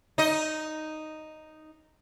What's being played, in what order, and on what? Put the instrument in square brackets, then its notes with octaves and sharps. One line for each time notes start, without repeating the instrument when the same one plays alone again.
[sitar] D#4 D#5